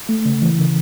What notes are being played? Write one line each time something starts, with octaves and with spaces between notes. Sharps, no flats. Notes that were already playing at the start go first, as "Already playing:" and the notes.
A3
C#3
E3
C#3